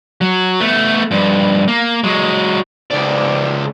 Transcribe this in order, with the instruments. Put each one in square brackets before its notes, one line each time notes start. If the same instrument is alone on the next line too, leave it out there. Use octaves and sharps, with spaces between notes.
[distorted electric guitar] F#3
A3 B3
G2 F3
A#3
F#3 G#3
C#2 D5